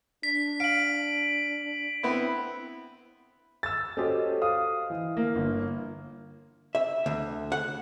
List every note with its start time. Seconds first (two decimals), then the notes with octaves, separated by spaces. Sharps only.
0.23 D4 B6
0.60 F5 D7 F#7
2.03 B3 C4 E4
3.63 E6 A6
3.97 C#4 F#4 G4 A4 C5 D#5
4.42 F5 D#6
4.90 E3
5.17 A#3
5.35 G1
6.75 E5
7.06 D2
7.52 F#5